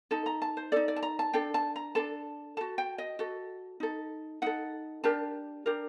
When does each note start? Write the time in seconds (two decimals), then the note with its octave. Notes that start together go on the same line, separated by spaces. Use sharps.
0.11 D#4 A4 A5
0.26 A#5
0.42 A5
0.57 C5
0.72 D#4 A4 D5
0.88 D5
0.96 A5
1.03 A#5
1.19 A5
1.33 D4 A4 G5
1.54 A5
1.76 A#5
1.95 D4 A4 A5
2.57 F#4 A4 A5
2.78 G5
2.98 D#5
3.19 F#4 A4
3.80 D#4 A4
4.42 D#4 A4 F#5
5.04 D4 G4 A#4 A5
5.66 D4 G4 A#4